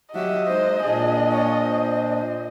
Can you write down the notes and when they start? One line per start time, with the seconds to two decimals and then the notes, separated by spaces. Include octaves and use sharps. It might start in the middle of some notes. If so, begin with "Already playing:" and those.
0.15 F#3 G4 D#5 E5 F#5
0.48 G#3 D#4 C5
0.84 A#2 D4 F4 G#4
1.28 F4 C#5
1.63 C5